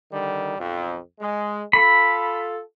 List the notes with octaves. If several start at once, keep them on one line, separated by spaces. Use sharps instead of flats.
D3 D#3 G3
B1 F2
G#3
F4 A4 B5